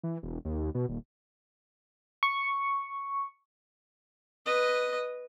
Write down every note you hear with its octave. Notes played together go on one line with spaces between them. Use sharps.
E3
E1
D#2
B2
D#1
C#6
B4 D#5